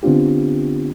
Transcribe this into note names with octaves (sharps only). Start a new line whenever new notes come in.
D3 B3 C4 D4 F4 G4